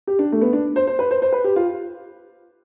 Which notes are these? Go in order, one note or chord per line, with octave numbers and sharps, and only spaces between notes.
G4
D4
A3
B3
D4
C5
C5
B4
C5
C5
B4
G4
F4